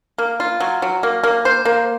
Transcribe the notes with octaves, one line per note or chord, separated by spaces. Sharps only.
A#3
F4
F#3
F#3
A#3
A#3
C5
A#3